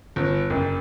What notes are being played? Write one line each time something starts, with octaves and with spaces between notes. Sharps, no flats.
G1
F#1